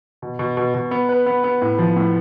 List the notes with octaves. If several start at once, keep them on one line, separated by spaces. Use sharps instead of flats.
B2
B2
B2
B2
B3
B4
B3
B3
A2
F3
A2